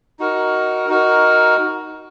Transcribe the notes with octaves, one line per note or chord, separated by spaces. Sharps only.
D#4 F#4 A#4
D#4 F#4 A#4